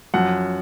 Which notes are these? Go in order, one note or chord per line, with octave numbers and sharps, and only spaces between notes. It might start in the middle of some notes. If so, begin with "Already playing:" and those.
F#2 F3 F#5